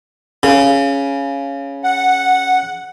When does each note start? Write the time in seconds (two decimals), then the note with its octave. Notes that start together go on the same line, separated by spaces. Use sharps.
0.43 C#3
1.84 F#5